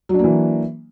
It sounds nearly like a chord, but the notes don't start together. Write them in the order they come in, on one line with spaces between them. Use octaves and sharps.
F#3 D4 A#3 E3